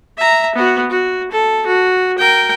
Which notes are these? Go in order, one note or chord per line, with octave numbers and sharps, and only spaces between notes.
E5 A#5
B3 F#4
F#4
A4
F#4
A#4 G5